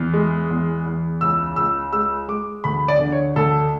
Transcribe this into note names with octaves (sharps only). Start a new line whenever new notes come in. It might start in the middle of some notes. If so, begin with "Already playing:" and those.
Already playing: E2
G#3
E2
E2
C#2 E6
C#2 E6
G#3 E6
G#3 D6
D2 B5
D5
D3
C#5
D2 A4